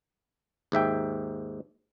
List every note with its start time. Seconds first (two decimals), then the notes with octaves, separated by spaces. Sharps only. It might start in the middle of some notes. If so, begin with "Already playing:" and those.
0.72 D#2 G#2 E5 G5